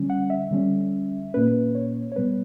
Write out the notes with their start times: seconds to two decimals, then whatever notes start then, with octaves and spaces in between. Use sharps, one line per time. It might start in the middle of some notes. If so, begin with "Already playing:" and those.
Already playing: D3 G3 C#4
0.10 F#5
0.30 E5
0.51 D3 G3 C#4
1.34 A#2 A#3 C#4 B4
1.75 C#5
2.12 C#5
2.16 B2 G3 B3 B4